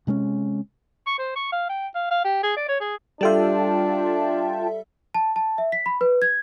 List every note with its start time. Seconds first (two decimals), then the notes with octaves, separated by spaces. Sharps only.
0.07 C3 G#3 A3 C#4
1.07 C#6
1.19 C5
1.35 C#6
1.52 F5
1.69 G5
1.95 F5
2.11 F5
2.24 G4
2.43 G#4
2.57 D5
2.68 C#5
2.80 G#4
3.21 G3 D4 F4 A4 E5 G5 A5
5.15 A5
5.36 A5
5.58 E5
5.72 B6
5.86 B5
6.01 B4
6.22 G#6